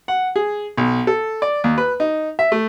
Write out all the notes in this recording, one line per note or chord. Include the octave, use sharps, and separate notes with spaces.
F#5
G#4
B1
A4
D5
D#2
B4
D#4
E5
A3